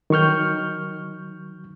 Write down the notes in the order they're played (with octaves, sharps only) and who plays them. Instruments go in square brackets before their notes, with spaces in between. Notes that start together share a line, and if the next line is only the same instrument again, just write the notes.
[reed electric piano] D#3 F#3 C#6 F6 G6